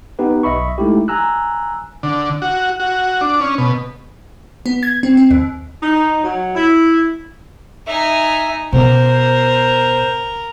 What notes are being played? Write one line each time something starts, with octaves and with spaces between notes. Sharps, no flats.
B3 D#4 G4 B4
B1 D#5 E5 B5 C#6
G#3 A3 D#4 E4 G4
G#5 A#5 E6 F#6
D3
F#4
F#4
D4
C#4
B2
B3
G#6
C4
C4
D#2
D#4
F#3
E4
D#4 E5 G#5
B2 A#4 C5